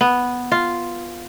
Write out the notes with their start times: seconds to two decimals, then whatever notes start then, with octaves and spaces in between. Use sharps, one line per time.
0.01 B3
0.52 F4